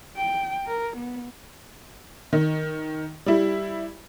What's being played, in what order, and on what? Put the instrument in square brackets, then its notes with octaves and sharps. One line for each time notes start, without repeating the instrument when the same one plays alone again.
[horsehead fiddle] G5
A#4
B3
[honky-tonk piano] D#3
G3 E4